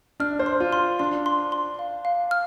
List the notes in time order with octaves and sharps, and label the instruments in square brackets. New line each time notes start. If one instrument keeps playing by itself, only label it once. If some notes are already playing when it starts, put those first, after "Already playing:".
[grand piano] D4 [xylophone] F6
[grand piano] C5
[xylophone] C6
[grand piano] F4
[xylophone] C6
[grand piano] D4 [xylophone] C6
[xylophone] C6
C6
F5
F5
F6